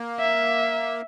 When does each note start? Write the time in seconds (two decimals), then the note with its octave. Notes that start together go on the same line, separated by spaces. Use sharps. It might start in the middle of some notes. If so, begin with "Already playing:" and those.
Already playing: A#3
0.20 E5